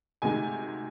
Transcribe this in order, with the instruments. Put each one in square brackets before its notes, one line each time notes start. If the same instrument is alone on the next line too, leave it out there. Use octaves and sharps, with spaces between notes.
[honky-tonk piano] D2 C3 D#3 G#3 G#5